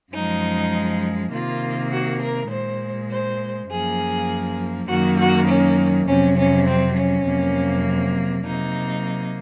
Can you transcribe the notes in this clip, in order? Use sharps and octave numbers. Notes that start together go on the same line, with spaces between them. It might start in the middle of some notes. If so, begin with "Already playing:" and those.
F#2 F3 G#3 D#4
C3 D#3 A#3 F4
F#4
A#4
A#2 G#3 C5
C5
F#2 F3 A#3 G#4
F#2 D#3 F#3 A#3 F#4
F#4
C#4
F2 C3 F#3 C#4
C#4
C4
C#4
F2 C3 F#3 A#3
C3 F#3 A#3 D#4